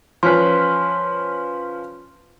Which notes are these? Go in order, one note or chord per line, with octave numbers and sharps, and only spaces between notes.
F3 C#4 B4 C6